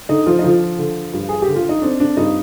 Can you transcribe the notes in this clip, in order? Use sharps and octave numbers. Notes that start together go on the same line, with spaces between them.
D3 D#4
F3 F4
D#4
D3 F3 F4
D3
G2
G#4
G4
D3
F4
D#4
C4 D4
D4
G2 D#4